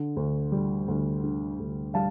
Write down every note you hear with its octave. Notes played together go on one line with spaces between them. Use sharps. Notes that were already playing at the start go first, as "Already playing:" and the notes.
Already playing: D3
D2
G3
D2
D3
D2
G3 F5 A5